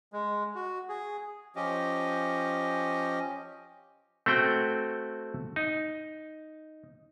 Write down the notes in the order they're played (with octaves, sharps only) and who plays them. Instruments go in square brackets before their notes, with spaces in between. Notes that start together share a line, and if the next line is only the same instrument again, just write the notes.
[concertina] G#3
F#4
G#4
[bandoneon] F3 C#4 G4 D#5
[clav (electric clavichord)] A3 C4 F#4 G5
D#4